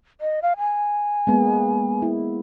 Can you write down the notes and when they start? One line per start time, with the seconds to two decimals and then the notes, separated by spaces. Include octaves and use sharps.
0.21 D#5
0.43 F5
0.58 G#5
1.27 G#3 A#3 B3
2.02 E4